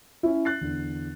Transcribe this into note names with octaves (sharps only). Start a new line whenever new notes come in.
C#4 E4
F#6 A6 C7
E2 D3